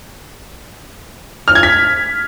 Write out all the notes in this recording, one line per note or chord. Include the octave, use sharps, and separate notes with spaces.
F6
G#6
B6